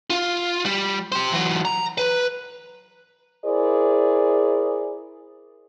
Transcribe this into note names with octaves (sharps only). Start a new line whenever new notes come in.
F4
G3
G4 C5
E3 F#3
A#5
B4
E4 G#4 A#4 C5 D5